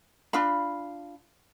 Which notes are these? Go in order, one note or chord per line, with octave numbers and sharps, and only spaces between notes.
D4 F4 F5 B5